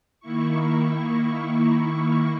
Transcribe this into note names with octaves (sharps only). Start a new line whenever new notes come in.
D#3 A#3 E4 C#6